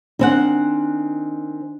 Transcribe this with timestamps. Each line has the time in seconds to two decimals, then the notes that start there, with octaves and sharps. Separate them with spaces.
0.19 D#3 C4 D4 F#5 G#5 F#6